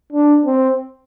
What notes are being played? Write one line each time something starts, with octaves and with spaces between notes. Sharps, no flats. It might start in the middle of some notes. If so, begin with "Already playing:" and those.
D4
C4